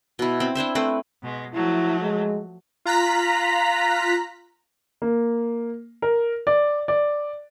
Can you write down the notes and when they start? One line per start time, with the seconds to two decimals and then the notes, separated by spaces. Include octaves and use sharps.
0.19 B2 E4
0.40 C4 B5
0.55 D4 E4 C5 E5
0.75 A3 C4 B4
1.23 B2 G#3
1.54 F3 F#3 A3 E4
2.01 G#3
2.85 F4 A#5 F#6 B6
5.02 A#3
6.02 A#4
6.47 D5
6.88 D5